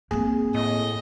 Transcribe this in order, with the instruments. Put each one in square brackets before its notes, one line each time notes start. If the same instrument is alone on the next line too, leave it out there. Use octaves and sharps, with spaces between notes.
[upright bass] A#3 C4 [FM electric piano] G#4
[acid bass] A2 [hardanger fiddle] D#5